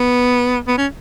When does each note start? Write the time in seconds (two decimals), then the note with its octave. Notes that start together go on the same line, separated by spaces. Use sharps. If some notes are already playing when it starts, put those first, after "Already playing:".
Already playing: B3
0.68 B3
0.78 C#4